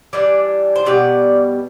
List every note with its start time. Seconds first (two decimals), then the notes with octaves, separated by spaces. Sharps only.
0.13 E3 G3 D4 D5
0.76 C5
0.85 B2 G3 B3 D5